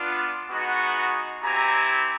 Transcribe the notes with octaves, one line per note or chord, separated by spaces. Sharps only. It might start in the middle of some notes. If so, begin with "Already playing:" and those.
Already playing: B3 D4 F4
G#3 B3 D#4 F#4
C4 E4 G4 G#5 A#5